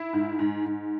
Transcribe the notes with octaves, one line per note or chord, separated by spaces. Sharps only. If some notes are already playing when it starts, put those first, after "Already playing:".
Already playing: E4
G#2
G#2
G#2